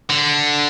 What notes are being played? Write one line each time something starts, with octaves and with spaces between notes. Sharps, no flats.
D3